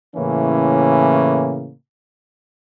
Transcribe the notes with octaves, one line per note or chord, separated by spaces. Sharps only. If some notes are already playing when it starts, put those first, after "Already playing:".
A2 C#3 E3 A#3 C#4